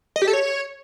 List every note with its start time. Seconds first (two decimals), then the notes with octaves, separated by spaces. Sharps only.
0.16 D#5
0.22 G4
0.28 A4
0.33 C#5